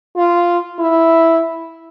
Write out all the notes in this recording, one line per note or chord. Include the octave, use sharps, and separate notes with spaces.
F4
E4